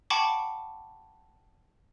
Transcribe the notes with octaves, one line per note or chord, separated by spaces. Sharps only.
F#5 G5 A5 B5 C#6 D6